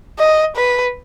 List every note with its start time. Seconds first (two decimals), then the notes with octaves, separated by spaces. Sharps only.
0.19 D#5
0.56 B4